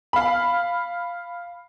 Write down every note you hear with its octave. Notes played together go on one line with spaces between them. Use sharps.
F5 B5